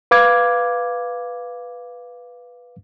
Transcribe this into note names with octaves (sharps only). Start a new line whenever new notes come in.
B4 F5 D6 G#6